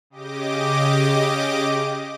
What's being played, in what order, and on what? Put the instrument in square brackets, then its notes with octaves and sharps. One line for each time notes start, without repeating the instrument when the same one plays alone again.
[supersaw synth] C#3 G4 D#5 D6